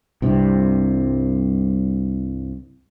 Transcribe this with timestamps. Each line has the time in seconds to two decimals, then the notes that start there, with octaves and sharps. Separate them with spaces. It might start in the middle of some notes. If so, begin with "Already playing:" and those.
0.22 C2 G2 C3